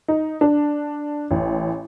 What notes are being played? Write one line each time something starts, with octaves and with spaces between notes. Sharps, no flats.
D#4
D4
A1